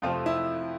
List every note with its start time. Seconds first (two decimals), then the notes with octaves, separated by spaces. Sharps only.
0.02 F2 C3 F3 A3 C4 F4
0.26 E4